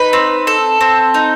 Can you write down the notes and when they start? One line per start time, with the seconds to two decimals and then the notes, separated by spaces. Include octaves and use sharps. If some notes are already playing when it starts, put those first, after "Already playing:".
Already playing: D#4 B4
0.13 C4
0.47 A4
0.81 C4
1.14 D#4